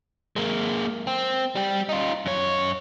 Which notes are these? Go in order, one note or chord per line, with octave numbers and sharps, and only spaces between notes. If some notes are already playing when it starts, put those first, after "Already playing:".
G#3 A#3
C4
G3 G4
D#4 F4
F#2 C#5